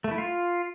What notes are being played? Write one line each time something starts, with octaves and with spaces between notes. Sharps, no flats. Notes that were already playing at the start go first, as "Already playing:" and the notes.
A3
E4
F4